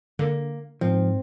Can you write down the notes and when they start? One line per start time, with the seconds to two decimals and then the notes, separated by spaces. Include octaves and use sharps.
0.19 D3 A#3
0.81 G#2 F3 C4